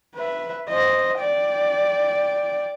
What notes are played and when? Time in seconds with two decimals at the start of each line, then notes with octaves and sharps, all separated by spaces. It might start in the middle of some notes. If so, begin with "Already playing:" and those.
0.16 B4 E5
0.69 C5 D#5
1.20 D5 G5